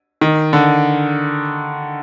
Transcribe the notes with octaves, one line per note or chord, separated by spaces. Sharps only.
D#3
D3